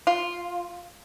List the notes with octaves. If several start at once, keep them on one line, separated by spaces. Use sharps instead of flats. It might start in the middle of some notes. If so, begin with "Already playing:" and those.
F4